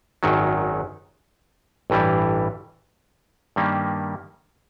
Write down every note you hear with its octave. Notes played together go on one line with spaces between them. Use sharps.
G#1 F#2 D#3 F#3
A1 G2 E3 G3
G2 D#3 G3 A#3 C#4